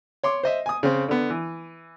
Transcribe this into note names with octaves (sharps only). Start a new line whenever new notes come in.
C#5 C6 D6
C5 D#5 E5
G#5 D#6
C#3 C4
D3 B3
E3